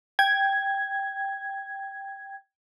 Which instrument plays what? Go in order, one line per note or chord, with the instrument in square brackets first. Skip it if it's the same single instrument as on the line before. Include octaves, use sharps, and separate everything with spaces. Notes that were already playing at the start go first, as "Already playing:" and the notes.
[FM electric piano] G5 G#6